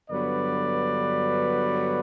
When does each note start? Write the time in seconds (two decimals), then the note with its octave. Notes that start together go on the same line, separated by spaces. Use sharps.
0.11 G2 D3 F#3 B3 B4 D5